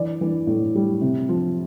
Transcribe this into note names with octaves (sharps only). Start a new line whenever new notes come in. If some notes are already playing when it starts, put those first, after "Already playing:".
Already playing: E3 D5
E3
A2
G3
C3
F3